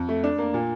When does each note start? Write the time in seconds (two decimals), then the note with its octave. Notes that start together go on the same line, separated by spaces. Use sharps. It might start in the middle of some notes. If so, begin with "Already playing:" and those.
Already playing: F2
0.09 A3
0.24 D4
0.38 A#3
0.54 A#2